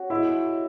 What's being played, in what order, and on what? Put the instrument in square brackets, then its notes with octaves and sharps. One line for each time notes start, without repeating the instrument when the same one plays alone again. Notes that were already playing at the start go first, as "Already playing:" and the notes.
Already playing: [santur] C#4 F#4
[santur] G#3 [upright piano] E4